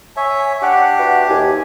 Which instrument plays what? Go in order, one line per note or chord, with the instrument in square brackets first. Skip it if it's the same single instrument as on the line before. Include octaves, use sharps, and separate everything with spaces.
[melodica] C#5 E5 [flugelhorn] G#5
[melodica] D4 G4 [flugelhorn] F#5
[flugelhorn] F#4 [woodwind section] B4 E5 F#5
[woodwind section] D#2 [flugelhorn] G#5